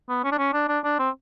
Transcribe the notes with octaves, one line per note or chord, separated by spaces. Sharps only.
B3
C#4
D4
C#4
D4
D4
D4
C4